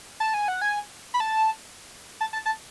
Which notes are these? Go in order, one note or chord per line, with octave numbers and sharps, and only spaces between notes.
A5
G#5
F#5
G#5
B5
A5
A5
A5
A5